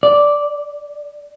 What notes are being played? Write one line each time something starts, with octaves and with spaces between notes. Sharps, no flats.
D5